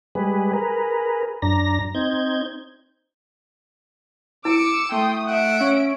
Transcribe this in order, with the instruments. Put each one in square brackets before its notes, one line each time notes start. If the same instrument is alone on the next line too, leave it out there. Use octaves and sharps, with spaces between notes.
[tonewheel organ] G3 G#3 G#4 B4
G#4 A#4 B4
F#2 D4 A#5 A#6
C4 D#4 G6 G#6
[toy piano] E4 [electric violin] D6 C#7 [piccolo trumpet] E6 [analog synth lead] D7
[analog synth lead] A3 [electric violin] G5 D#6 [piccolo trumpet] C6
[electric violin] E5 D7 [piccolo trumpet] F#5
[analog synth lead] C#4 [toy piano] F5